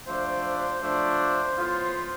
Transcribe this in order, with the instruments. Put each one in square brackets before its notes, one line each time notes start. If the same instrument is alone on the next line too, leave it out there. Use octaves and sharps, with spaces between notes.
[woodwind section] F3 A3 D4 [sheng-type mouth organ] C5
[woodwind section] F3 A3 D4
A2 F3 B3 F4